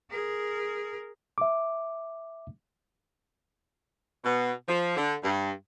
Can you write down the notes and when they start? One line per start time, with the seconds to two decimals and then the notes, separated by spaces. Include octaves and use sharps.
0.10 G#4 A#4
1.38 E5 D6
4.24 B2
4.67 F3
4.96 D3
5.23 G2